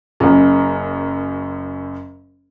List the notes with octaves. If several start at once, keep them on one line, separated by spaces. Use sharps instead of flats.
F#1 F#2